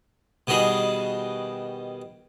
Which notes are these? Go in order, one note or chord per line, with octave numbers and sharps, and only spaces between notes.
B2 D#3 G3 F#4 G#4